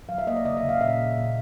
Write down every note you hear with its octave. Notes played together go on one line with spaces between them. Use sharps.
F#3 F5
E5
A#3 D#5
D5
C#3 D#5
E5
C#3
F5
A#2 E5
A#2
A#2